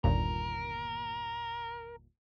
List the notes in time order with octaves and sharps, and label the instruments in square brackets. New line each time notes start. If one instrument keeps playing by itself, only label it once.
[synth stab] G1 D#2 A#2 [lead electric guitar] A#4